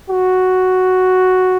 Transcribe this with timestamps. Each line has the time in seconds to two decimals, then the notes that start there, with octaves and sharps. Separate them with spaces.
0.10 F#4